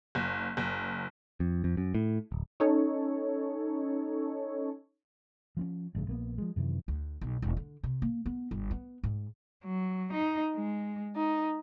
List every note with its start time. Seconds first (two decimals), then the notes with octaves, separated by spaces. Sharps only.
0.15 F#1
0.57 F#1
1.40 F2
1.64 F2
1.77 F#2
1.94 A2
2.32 D1
2.60 C#4 D#4 A4 C#5
5.57 F3 C4 C#4
5.95 A1 G2 C#3
6.07 A#1 A#3 B3
6.38 F3 G#3
6.56 F#2 C3 D#3 E3
6.88 D2
7.21 B1
7.42 E1
7.57 D3
7.83 C3
8.02 A#3
8.26 B3
8.51 G1
8.71 B3
9.04 G#2
9.65 F#3
10.14 D#4
10.56 G#3
11.16 D#4